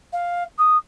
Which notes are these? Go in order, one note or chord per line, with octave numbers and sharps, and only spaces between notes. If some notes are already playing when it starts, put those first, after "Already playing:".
F5
D#6